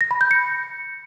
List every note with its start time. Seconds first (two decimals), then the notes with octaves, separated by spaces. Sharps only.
0.01 A#6
0.11 B5
0.21 G6
0.31 C#7